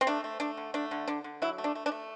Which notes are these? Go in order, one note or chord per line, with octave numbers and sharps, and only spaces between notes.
C4
A3 D4
A3
A3 D4
D3
A3 D4
D3
D3 D4
D3
F#3 E4
A3
D4
A3
D4
A3